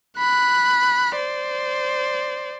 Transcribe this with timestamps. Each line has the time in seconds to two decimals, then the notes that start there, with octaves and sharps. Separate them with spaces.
0.19 B5 F#6
1.16 C5 D5